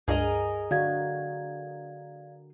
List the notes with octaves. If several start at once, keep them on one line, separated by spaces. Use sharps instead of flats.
C#2 G2 G#4 A#4 D#5
D3 F#4 D5 F5 G#6